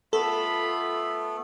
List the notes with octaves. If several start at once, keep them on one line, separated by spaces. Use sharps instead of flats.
A3 B3 F4 A4 B5